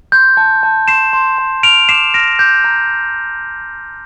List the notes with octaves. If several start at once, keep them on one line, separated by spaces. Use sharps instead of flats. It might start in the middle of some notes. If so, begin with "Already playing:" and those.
C6 G6
A5
A5
C6 C7 E7
C6
A5
F6 D7 F7
D6 C7 E7
F6 A#6 D7
D6 G6
A#5